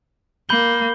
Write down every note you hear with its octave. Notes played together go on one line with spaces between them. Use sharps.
A#3 B5 G6 G7